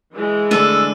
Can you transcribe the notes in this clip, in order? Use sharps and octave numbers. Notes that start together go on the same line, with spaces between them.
E3 G#3
D3 A3 A4 E6 F#6 D#7